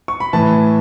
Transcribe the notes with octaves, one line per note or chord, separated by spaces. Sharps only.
C#6
B5
A2 E3 A5